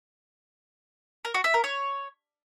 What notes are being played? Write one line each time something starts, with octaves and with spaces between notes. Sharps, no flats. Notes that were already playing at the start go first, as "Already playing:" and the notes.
A#4
F#4
E5
A#4
C#5